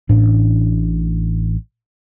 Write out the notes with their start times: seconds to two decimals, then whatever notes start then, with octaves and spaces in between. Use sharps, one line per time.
0.09 A1 A2 D4